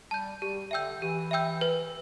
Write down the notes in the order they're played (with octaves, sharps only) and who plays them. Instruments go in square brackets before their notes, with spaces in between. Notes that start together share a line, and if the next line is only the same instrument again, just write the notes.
[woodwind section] G3 [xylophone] A5 G6
[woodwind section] G3 [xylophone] G4
[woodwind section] D3 [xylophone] E5 G5 E6 G6
[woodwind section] E3 [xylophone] G4
[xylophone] E5 G5 E6 G6
B4